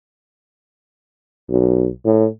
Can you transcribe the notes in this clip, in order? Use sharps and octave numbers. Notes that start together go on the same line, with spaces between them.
B1
A2